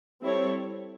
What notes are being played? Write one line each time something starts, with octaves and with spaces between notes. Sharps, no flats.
G3 C4 E4 A4 C#5